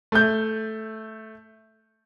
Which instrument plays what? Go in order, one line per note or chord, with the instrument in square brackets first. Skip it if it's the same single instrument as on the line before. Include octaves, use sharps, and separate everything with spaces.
[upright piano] A3 G6